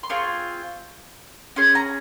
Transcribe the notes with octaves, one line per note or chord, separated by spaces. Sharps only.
C6
C4 F4 G#4 C#6
C#4 G#4 C6
A#5